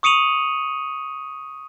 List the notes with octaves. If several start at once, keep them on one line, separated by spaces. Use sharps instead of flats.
C#6 D#6 C#7 D#7 F7 F#7